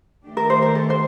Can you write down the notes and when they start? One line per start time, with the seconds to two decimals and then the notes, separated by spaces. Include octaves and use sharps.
0.24 D#3 A3 D4 G4
0.37 A#4
0.50 C5
0.62 A#4
0.75 A4
0.90 C5